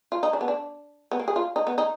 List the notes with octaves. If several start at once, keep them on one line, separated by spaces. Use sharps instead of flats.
F4
D#4
D4
B3
D4
B3
A#3
G#4
F4
D#4
B3
D#4